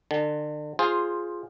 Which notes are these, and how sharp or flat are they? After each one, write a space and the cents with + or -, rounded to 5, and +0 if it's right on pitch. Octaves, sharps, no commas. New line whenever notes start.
D3 +40 A5 -40
F4 +0 G#4 +0 C5 +10